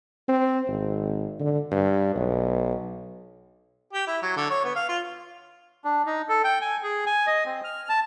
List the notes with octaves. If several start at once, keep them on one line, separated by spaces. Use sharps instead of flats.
C4
G#1
D3
G2
B1
G4
E4
F#3
D3
C#5
B3
F5
F4
D4
D#4
A4
G5
G#5
G#4
G#5
D#5
C4
F6
A5